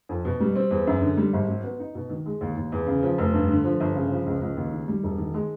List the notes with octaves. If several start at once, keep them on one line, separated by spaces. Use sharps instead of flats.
F2
B2
G3
C4
E2
F#2
D3
G3
G#1
F#3
B3
D#4
B2
D#3
G#3
D#2
D#2
E2
C#3
F3
F1
G2
D3
F3
G1
C#3
F3
C#2
C#2
D#2
D#3
G3
E1
D#3
G#3